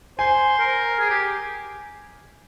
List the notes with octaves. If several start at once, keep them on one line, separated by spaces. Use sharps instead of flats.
C5 G#5
A#4
G#4
G4